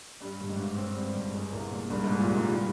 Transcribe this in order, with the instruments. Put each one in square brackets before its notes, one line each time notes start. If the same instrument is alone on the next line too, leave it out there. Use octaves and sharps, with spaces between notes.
[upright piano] G2 [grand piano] G3
[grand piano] G1
[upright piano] G#2
[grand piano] G2
C4
G3
G1
G#3
C2
A#2
[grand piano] C2 [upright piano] G2
[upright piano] G#2 [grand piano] G#3
[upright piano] A#2
[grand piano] C2 [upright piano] G#2
[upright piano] G2 [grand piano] D#3